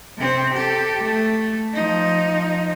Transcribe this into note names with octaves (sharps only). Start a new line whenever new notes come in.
C3 C4
G4 A4
A3
F3 D#4